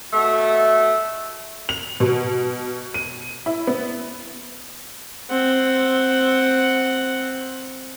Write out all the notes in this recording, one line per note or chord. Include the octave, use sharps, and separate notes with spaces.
B2 A3
F7
B2
D#7
E4
B3
C4 F#5